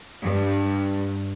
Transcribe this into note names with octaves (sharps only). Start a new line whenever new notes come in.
G2